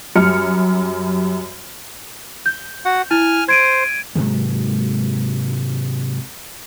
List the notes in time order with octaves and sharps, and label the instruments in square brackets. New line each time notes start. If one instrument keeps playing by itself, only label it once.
[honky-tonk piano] F#2 G3 F6 C#7
[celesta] G6
[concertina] F#4 F#5
[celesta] E4 [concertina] G#5 F6
[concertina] C5 [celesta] G#6 D7 D#7
[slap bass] G#2 C3 F#3 G#3